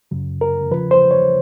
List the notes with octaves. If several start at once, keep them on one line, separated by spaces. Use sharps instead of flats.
F#2 C#3 F#3
A#4
E2 C#3 F3 B4
C5
C#5